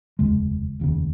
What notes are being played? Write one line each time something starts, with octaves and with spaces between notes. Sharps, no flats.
F1 D#2 C#3 G#3
F1 D#2 C#3